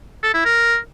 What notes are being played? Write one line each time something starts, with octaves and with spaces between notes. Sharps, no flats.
A4
E4
A#4